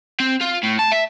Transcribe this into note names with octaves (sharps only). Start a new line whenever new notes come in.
C4
F4
A2
A5
E5